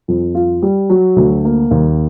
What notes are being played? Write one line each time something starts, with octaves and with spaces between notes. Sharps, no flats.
F2
F4
G3
F#3
D2
A#3
D#2